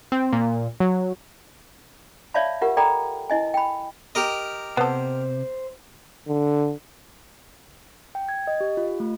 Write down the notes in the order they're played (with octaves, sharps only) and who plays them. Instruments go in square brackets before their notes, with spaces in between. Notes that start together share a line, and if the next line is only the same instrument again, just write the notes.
[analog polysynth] C4
A#2
F#3
[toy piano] C#5 D5 E5 F5 A5 B5
F4 G4 A#4 F#5
A4 D5 G5 A#5 B5
E4 D#5 G#5
G5 B5
[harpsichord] G4 A#4 D#5
[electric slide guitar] C3 [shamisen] B3 A4 [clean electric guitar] C5
[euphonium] D3
[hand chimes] G5
G#6
D#5
G4
F4
A3